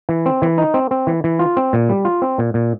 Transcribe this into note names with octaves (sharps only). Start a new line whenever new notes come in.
E3
C4
E3
D#4
C4
C4
E3
E3
F4
C4
A#2
G3
F4
C4
A#2
A#2